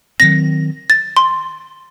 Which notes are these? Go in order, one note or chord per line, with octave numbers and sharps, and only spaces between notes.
D#3 F#3 C4 A#6
A6
C6